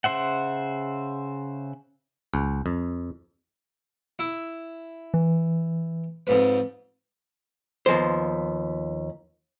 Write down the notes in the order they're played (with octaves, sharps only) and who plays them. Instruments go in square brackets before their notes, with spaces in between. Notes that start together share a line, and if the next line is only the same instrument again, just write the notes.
[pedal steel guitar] C#3 F3 C5 E5 F#5
[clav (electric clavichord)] C#2
F2
[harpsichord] E4
[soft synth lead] E3
[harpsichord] F2 G#2 B4
[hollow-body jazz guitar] D#2 F3 B3 C5